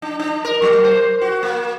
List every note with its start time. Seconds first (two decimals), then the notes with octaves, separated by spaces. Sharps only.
0.02 D4
0.19 D4
0.45 A#4
0.62 F#3
0.84 C5
1.21 F#4
1.43 A#3